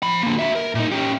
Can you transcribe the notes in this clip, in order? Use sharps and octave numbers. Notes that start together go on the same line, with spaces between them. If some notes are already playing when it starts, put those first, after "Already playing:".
F3 B5
D3 A#3
F#4 E5
A#4
A#2 D#4
C#4 G4